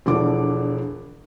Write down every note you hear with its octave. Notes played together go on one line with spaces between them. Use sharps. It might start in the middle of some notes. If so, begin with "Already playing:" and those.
E1 D3 E3 F3 D6